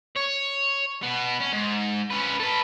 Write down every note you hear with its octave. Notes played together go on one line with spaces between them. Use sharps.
C#5
B2 B3
C#4
G#2
C#4 B4
A4 B4